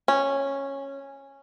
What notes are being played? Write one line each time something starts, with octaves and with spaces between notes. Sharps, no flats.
C#4